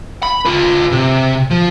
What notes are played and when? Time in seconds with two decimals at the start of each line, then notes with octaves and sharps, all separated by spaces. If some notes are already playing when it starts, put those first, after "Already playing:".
0.23 B5
0.45 F4 B4
0.91 C3
1.51 F3